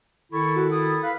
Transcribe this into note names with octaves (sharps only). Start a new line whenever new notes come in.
D#3 E4 A4 C#6
F#4
D#6
B4 F5